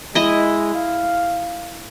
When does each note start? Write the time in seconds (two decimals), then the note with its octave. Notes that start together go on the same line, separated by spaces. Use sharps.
0.15 G#3 E4 D#5
0.75 F5